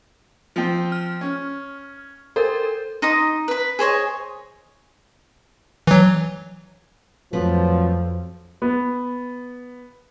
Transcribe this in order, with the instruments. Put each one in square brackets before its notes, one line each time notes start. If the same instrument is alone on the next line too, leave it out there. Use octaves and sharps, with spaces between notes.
[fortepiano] F3 C4
[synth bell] F6
[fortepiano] C#4
[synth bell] A4 A#4 [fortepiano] C5
[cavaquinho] D#4 D#5 C6 D#6
B4 B5
G#4 C5 C#5 D#5
[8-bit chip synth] E3 F#3
[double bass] F2 [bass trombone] F3 [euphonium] F#3 [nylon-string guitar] A3 C4 B4
[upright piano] B3